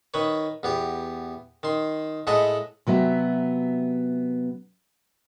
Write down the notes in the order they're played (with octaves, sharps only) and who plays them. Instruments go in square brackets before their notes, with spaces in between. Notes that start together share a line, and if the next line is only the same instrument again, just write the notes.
[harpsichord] D#3 B4 C#5
E2 B3 G4
D#3 C6
A2 G#3 A4 D#5 F#5 B5
[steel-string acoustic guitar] C3 F#3 B3 E5